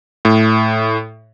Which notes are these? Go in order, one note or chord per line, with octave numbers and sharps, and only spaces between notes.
A2